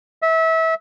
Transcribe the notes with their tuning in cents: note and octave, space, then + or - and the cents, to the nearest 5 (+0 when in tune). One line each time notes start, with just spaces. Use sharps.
E5 -25